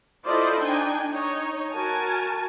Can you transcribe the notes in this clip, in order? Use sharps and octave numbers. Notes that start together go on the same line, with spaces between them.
E4 F4 A4 C5 D5 D#5
D4 D#4 G5 G#5
D#4 C#5
F#4 A#4 G#5 A5